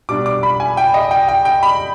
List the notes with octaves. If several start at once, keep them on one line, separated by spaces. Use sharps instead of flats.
B2 G3 D4 D6
D6
B5
G#5
G5
D#5
G5
G5
G5
B5